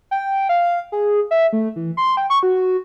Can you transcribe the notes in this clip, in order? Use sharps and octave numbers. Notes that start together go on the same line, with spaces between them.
G5
F5
G#4
E5
A3
E3
C6
G5
C#6
F#4